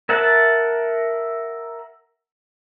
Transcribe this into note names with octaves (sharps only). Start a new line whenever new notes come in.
A#4 E5 F#5 A5